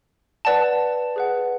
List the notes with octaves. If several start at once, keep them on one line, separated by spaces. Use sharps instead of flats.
B4 D5 F#5 A5
G#4 B4 F#5